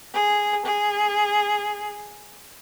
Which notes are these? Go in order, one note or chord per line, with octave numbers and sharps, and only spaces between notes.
G#4
G#4